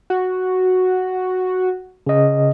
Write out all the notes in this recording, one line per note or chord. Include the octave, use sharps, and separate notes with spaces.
F#4
C#3 D#5